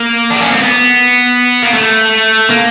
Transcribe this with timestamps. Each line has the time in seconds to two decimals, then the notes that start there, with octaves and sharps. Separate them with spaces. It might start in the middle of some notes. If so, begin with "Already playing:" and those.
Already playing: A#3
0.30 D4
0.41 C#4
0.51 C4
0.63 B3
1.63 A#3
1.74 A3
2.50 A#3